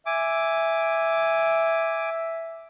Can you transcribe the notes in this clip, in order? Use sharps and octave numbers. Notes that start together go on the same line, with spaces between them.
E5 G#5 D6